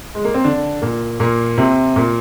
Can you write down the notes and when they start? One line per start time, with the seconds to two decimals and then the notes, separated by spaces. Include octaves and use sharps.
0.15 G#3
0.25 A#3
0.34 C4
0.44 D3 D4
0.82 A#2 A#3
1.20 A#2 A#3
1.58 C3 C4
1.96 A#2 A#3